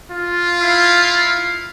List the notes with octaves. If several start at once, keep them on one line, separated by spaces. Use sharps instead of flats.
F4
E4 F5